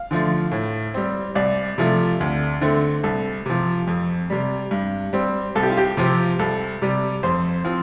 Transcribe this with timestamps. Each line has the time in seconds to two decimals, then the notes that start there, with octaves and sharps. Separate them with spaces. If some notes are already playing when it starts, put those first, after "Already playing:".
Already playing: F5
0.11 D3 F3 A3
0.51 A2
0.94 G3 C4
1.35 C2 D5
1.78 C3 F3 A3
2.20 D2
2.61 D3 A3 C4
3.03 C2 A4
3.46 C3 F3
3.87 F2
4.30 C3 G3
4.71 G2
5.13 G3 C4
5.55 C2 A4
5.63 G4
5.70 F4
5.77 G4
5.97 C3 F3 C4
6.39 C2 A4
6.82 C3 G3
7.23 F2 C5
7.64 F3 C4